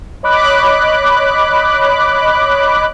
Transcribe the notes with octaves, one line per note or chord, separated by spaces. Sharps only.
C#5 D#5 B5 D6 F#6